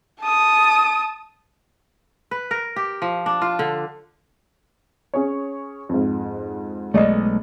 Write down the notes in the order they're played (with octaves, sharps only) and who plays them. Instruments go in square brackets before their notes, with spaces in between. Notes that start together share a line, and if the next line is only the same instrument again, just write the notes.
[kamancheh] A5 D#6
[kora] B4
A#4
G4
F3
D4
F4
D3
[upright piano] C#4 G#4 C#5
F2 G#2
[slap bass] B1 G#3 A3 [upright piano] D5 D#5